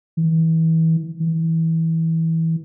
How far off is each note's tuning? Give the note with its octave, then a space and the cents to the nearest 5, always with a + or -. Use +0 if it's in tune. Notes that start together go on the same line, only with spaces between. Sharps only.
E3 -30
E3 -20